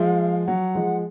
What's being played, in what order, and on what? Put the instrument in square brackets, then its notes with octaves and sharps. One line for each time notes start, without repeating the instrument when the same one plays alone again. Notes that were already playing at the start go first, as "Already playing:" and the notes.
Already playing: [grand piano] F3 G#3 [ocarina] F5
[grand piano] F#3 [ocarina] F#5
[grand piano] F3 G#3